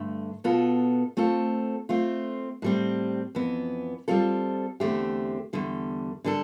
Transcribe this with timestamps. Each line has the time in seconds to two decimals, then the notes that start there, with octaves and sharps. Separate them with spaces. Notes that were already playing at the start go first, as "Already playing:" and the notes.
Already playing: G2 D3 A3
0.44 B2 B3 F4 A4
1.17 A3 C4 F4 A4
1.89 A3 C4 F4
2.62 A2 G3 C4
3.35 F2 E3 B3
4.08 G3 C4 F4 A4
4.80 E2 D3 A3 C4 G4
5.53 E2 D3 G3
6.24 D3 G3 D4 A4